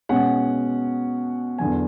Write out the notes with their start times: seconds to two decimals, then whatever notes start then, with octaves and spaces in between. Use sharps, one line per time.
0.09 B2 G#3 C#4 F#5
1.58 E2 D3 F#3 G#5